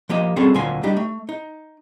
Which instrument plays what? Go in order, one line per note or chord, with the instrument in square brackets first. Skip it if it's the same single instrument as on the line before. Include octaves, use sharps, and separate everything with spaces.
[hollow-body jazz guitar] F3 A#3 G4 D#5
G3 C4 C#4 F#4 G#4 A4
D2 A#2 F#3 A#3 G#5 C6
G3 D4 D#4 G4
A3
D#4